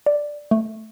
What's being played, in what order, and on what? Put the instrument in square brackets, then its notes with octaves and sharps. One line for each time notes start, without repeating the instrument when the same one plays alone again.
[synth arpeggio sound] D5
A3